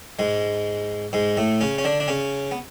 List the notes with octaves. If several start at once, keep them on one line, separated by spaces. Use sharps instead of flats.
G#2 G#3
G#2 G#3
A2 A3
C#3 C#4
C#4
D3 D4
D4
C#3 C#4
B3